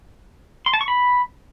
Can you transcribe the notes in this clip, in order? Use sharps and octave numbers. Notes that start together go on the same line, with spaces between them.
C6
A5
C#6
B5